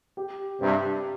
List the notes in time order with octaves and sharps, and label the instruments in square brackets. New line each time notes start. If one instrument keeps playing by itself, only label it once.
[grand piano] G4
[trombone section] G2 C3 [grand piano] G4